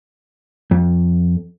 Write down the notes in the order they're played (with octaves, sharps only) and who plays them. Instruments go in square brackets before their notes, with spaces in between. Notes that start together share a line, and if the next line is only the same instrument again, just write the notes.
[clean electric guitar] F2